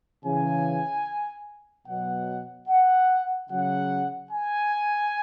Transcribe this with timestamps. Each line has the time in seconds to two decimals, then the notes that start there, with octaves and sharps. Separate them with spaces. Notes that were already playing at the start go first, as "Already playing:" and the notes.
0.24 C#3 E3 G#5
1.87 B2 F#3 F#5
2.68 F#5
3.50 C#3 F#3 F#5
4.31 G#5